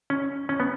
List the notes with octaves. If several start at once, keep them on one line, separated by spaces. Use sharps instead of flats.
C#4
C#4
B3